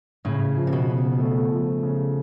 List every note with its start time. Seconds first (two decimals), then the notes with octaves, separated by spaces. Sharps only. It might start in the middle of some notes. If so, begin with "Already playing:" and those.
0.25 A2 C#3
0.56 F3
0.67 C3
0.73 B2
0.88 C#3
1.20 A3
1.51 F3
1.83 C#3